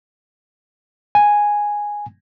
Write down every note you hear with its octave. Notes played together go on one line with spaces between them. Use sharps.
G#5